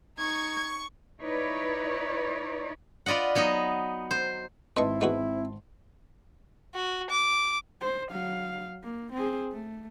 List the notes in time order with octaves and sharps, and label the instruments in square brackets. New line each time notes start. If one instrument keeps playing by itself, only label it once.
[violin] D#4 [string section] C#6 [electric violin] G#6
[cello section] D#4 E4 B4 C#5 D5
[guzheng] F4 B4 D5 D#5 F#5
F#3 B3 D#4 D#5
C5
[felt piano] G#1 A5 C6 [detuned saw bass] C4 [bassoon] E4 [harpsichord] B4 D#5 C#6
[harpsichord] G#3 B3 F#4
[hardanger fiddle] F#4
D6
[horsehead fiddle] C5
F#3 F5
A#3
C4 G#4
A3